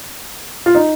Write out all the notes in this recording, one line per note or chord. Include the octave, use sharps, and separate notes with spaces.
F4
D#4